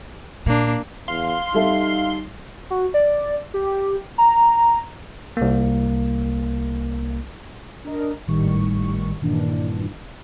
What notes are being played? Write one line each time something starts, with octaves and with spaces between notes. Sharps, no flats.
A#2 A#3 D4
E2 F5 C6
G3 D#4 A4 E5
F#4
D5
G4
A#5
C2 A#3
D4 A#4 D#5
G#1 A2 D#3 G3 C#6
G2 A#2 D#3 E3 D4